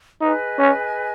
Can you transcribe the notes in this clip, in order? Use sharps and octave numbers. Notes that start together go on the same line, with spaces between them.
D#4 G#4 B4 D#5 G#5
C#4